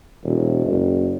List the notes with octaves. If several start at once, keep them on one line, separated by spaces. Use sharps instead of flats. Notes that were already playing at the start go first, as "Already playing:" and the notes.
E1
F#1